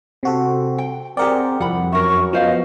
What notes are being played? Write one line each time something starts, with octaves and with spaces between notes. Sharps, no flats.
C3 C4 F#4 A4
G5
C4 G4 G#4 A#4 D5 F#5 G5
C2 F2 F#5 B5
F#2 A#4 E5 C#6
F3 B3 C#4 C5 D#5 F5